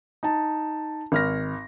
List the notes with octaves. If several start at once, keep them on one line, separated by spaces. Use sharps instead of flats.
D#4 A5
G#1 F6 A#6